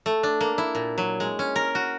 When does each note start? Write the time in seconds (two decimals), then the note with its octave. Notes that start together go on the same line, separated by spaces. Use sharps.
0.06 A3
0.23 D4
0.41 A#3
0.58 E4
0.75 A#2
0.98 F#3
1.20 G#3
1.39 C#4
1.56 A#4
1.75 F#4